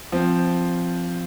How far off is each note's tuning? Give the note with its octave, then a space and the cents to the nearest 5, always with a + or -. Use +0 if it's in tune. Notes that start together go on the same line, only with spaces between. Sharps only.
F3 +0 C4 +0